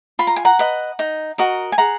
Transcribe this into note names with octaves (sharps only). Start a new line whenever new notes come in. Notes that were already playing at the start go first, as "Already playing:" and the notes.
F4 B5
A#5
G#5
F#5 A#5
B4 D#5
D#4
F#4 A#4 D#5
G#5
G#4 F#5 A#5